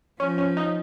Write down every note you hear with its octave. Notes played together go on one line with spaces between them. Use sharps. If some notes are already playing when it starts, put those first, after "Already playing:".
F3 C#4
C#4
D#4